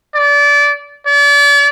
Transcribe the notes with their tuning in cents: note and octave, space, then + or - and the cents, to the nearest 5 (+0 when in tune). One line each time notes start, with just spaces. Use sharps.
D5 -25
D5 -40